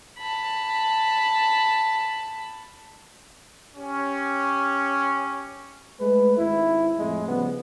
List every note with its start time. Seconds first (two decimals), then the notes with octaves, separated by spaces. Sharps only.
0.19 A5 B5
3.76 C#4 G4
6.00 G#3 A3 B4
6.37 G#1 G#2 E4
6.98 F2 A2 G#3
7.28 C#3 F3 G3 B3